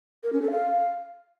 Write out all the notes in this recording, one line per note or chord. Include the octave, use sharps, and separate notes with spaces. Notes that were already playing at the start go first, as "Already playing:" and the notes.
A#4
C#4
A4
F5